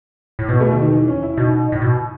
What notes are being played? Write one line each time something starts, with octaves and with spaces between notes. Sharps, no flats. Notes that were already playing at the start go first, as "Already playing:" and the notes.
A2
B2 B3
A3
D#3
D#3
E3
C#4
E4
B2 D#4
A2
B2